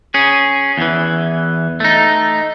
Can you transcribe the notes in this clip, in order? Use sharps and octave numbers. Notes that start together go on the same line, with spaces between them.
C#4 G#4
E2 E3
A3 D#4